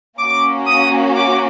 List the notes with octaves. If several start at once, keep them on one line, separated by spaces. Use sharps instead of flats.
A#3 C#4 F#4 D6
D#6
D6